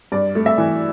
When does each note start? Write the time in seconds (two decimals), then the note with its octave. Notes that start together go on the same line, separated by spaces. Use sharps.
0.12 G2 D5
0.35 A3
0.46 E5
0.58 E3